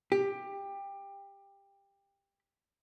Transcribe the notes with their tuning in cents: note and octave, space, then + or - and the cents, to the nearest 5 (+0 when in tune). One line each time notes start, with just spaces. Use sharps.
G4 +20